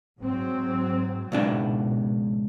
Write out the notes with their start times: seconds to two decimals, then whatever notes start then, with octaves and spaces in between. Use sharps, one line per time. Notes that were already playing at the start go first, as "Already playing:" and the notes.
0.21 G#2 F#3 C4
1.32 C#2 G#2 B2 D4